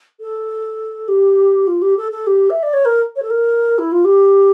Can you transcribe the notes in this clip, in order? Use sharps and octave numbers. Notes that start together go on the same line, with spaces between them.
A4
G4
F4
G4
A4
A4
G4
E5
D5
C#5
A#4
C#5
A4
A#4
E4
F4
G4